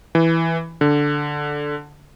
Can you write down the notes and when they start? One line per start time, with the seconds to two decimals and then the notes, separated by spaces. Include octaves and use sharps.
0.15 E3
0.81 D3